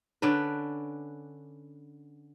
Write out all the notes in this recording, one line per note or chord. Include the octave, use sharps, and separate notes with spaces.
D3 C#4 D4 B4